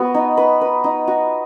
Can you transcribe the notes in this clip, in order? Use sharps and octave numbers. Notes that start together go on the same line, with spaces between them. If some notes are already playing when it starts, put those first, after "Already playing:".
Already playing: B3 F#4 B4
D#4
B4
B4
D#4
F#4